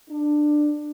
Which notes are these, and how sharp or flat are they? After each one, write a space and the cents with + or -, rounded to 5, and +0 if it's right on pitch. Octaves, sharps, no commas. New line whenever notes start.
D4 +15